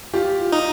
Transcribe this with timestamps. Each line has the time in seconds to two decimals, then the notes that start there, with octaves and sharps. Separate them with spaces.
0.13 F4 G4
0.52 D#4